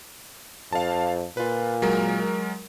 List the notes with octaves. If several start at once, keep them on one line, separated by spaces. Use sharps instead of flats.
F2 F5 A5
A#2 F4 B4
F#3 G#3 A#4